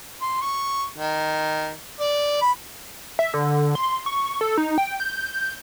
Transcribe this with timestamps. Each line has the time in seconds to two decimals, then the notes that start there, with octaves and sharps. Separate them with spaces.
0.21 C6
0.41 C#6
0.98 D#3
2.00 D5
2.41 B5
3.19 E5
3.34 D3
3.75 C6
4.06 C#6
4.41 A4
4.58 D#4
4.78 G5
5.00 G6